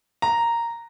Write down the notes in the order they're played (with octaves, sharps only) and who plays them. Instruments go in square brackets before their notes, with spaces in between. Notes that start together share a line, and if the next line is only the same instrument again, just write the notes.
[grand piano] A#5